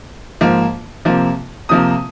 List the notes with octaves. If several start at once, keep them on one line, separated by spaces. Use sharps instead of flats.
G#2 F3 A#3
C3 F3 A#3
C3 F3 A#3 D#6